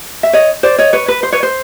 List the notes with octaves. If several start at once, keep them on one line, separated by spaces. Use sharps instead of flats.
E5
C#5 D#5
C5 D5
C#5 D#5
B4 C#5
B4
C5
B4 C#5
C5